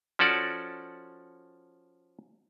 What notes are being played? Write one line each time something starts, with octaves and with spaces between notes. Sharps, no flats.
F3 C#4 F#4 A4 D5